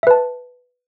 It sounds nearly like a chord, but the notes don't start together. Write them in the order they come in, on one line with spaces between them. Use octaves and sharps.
E5 B4 A5